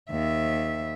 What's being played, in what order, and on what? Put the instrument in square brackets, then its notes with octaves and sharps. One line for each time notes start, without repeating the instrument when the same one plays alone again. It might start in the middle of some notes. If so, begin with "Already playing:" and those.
[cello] D#2 E5